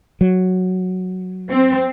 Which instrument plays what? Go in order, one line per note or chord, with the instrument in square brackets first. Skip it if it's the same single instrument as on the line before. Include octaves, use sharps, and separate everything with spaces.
[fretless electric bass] F#3
[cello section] C4